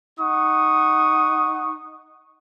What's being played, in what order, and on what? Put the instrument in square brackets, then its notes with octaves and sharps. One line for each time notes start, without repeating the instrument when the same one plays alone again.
[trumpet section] D#4 F#5 C#6 D#6